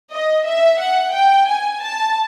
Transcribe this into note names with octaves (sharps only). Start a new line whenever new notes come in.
D#5
E5
F#5
G5
G#5
A5